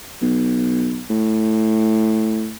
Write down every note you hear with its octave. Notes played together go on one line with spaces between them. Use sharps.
B1
A2